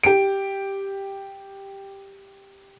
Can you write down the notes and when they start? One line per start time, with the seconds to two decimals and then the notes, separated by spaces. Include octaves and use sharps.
0.04 G4 D7